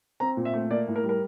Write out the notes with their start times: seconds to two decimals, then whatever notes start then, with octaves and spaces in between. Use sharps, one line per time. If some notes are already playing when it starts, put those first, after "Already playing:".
0.20 C4 A#5
0.37 A#2
0.45 E5
0.54 A3
0.71 A#3 D5
0.87 A2
0.96 A#4
1.03 G3
1.09 A#4